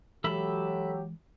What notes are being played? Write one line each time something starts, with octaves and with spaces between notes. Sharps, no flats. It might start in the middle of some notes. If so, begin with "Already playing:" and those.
E3 F#3 G#3 G4 A4 E5 B5